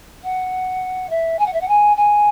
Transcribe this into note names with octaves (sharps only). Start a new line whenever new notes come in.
F#5
E5
G#5
F#5
E5
F#5
G#5
G#5